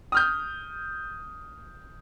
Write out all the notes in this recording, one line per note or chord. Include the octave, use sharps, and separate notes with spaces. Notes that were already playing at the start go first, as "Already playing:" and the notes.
D#6 F6 G6